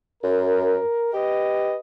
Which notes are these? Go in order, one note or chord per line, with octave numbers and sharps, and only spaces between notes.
F#2 A#4
G4 B4 D#5